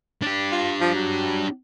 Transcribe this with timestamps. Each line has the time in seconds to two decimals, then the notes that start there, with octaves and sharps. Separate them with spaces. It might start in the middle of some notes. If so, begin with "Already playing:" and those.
0.22 D4 G4
0.52 F4
0.81 F3
0.96 F#3